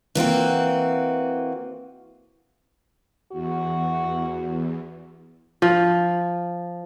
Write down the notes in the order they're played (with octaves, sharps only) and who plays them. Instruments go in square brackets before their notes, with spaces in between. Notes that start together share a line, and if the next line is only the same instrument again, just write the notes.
[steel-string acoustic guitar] E3 A#3 C4 F#4
[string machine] E2 [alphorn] F#4
[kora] F3